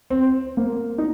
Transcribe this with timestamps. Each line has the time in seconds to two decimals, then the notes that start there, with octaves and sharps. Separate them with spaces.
0.10 C4
0.57 A#3
0.98 D#4